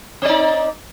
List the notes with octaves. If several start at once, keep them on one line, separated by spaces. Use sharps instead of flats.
C4 D#4 D5